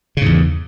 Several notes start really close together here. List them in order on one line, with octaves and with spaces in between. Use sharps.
C#3 G#2 E2